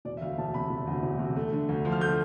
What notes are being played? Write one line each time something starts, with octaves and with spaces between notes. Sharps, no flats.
E1 D5
E5
D2 F5
E1 A5
C3 B5
E1
D2
E1
C3
A3
D3
D2
F3
F6
A3 G6